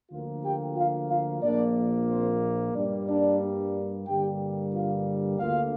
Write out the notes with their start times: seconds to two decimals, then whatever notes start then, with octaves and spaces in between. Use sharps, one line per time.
0.11 D2 D3 F3 A#3 F4
0.44 G4 G5
0.76 F4 F5
1.10 F4 F5
1.42 A#1 A#2 A#3 D4 D5
2.08 C4 C5
2.74 G2 G3 A#3 D4 D5
3.08 D4 D5
4.07 G2 D3 G3 A#3 G4 G5
4.73 F4 F5
5.39 D2 D3 A#3 F4 F5